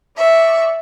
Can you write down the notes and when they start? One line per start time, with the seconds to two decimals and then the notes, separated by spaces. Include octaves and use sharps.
0.16 D5 E5 C#6